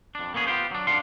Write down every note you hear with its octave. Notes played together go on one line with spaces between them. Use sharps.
F2 D4
A#3 B3 C#4 G#4
B3 F4 G4 C5
F#3 D4
G2 D4 F5 F#5 C6